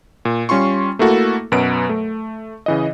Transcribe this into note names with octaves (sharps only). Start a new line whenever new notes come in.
A#2
G3 C#4 F4 C6 C#6
A3 A#3 E4 F#4 A4
F#2 B2 F#3 B4 D7
A3
C#3 E3 D#5